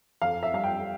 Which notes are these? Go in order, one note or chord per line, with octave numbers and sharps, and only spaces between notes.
F2 F5
E5
G3 F5
G5